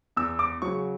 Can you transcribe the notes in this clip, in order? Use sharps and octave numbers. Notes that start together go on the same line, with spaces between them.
E2 E6
D6
C#3 F#3 C#6